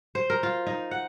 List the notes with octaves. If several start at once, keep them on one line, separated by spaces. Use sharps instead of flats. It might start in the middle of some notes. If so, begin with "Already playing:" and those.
C5
A#4
F4
D#4
F#5